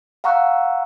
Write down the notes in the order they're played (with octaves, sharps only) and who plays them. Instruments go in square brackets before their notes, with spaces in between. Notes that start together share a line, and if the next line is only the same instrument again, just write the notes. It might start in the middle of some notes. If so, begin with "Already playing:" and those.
[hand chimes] F5 F#5 A#5 C#6 E6 F#6